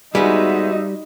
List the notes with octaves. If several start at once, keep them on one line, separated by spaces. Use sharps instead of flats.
G3 G#3 B3 D#4 F#4 E5